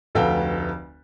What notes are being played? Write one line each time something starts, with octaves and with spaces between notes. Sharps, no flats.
F1 D2 A4 B4 F5 G5